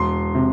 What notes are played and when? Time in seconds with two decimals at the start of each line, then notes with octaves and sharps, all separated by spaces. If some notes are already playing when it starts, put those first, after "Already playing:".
Already playing: E1 C6
0.35 C3